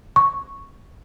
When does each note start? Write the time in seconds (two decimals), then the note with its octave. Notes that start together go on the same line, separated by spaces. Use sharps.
0.16 C#6